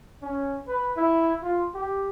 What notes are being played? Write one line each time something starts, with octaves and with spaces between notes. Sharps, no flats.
C#4
B4
E4
F4
G4